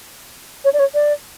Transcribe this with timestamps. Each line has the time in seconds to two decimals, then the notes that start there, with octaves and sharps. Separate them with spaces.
0.64 C#5
0.73 D5
0.79 C#5
0.94 D5